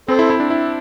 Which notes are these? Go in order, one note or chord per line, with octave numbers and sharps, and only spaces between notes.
C4 A4 C5
E4
E4
D4
E4